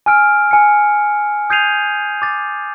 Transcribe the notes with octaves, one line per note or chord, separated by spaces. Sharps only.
G#5 E6 F6 D7
G#5 C#7
D#6 G6 G#6 C7 D#7 F7
D6 A6